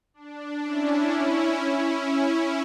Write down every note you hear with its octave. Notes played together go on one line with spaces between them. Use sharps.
D4
C#4 E4
C#4 E4